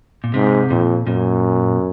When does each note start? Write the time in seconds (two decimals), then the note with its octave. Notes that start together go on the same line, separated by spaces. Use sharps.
0.24 A#2
0.34 G#2 C3
0.70 F2 A#2
1.07 F#2 A#2